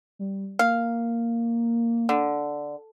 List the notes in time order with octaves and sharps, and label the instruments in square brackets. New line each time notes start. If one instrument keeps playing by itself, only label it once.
[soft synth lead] G3
[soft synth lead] A#3 [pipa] F5
[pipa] D3